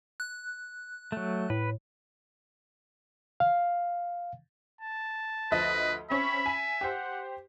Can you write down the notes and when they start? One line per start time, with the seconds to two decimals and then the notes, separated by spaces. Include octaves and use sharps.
0.20 F#6
1.12 F#3 A3
1.50 A2 B4
3.40 F5
4.81 A5
5.51 D2 F3 B4 D#5
6.10 C4 C#4 E5 B5
6.46 G#5
6.81 G4 C5 F#5